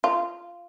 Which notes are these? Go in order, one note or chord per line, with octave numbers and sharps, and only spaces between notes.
F4